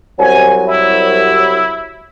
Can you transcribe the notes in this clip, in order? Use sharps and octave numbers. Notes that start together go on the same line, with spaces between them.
C2 F#3 G#5
E4